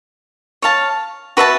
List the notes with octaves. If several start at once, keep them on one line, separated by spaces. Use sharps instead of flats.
C#5 F5 A5
F#4 B4 E5 A5